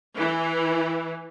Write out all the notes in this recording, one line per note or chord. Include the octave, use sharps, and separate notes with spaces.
E3